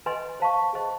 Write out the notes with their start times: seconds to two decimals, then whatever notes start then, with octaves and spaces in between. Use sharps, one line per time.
0.06 B4 D#5 G#5 C6
0.40 C5 F5 A5 C#6
0.73 G#4 C5 D#5